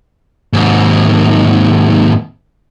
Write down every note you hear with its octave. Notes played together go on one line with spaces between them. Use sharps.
D#2 G#2